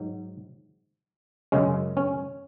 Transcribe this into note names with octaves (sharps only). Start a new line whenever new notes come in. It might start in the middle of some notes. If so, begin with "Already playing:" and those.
Already playing: G#2 F#3
F#2 C#3 G#3 C#4
C#4